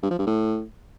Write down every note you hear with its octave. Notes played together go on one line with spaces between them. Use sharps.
G2
F3
G2
A2